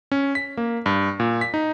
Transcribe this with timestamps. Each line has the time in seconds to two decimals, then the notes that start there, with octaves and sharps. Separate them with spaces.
0.12 C#4
0.35 B6
0.57 A#3
0.86 G2
1.20 A#2
1.41 B6
1.54 D#4